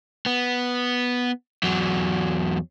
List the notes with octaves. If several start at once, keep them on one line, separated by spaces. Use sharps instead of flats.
B3
E2 F#3